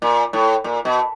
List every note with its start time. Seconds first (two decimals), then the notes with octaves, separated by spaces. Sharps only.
0.02 A#2
0.33 A2
0.64 A#2
0.85 B2